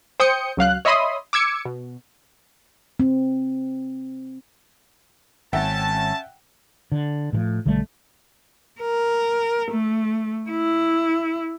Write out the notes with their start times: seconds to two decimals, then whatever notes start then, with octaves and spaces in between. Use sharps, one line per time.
0.20 C5 G5 D#6 G6 C#7
0.57 C#2 F#3 F5 F#6
0.85 C#5 D#5 E5 B5 C6 D#6
1.33 D6 E6 G#6 C#7
1.65 B2
3.00 C4
5.53 G#1 C#4 E5 F#5 G5 A5
6.92 D3
7.33 A2 E3 F3
7.65 B1 D3 G3 A3
8.81 A#4
9.71 A3
10.50 E4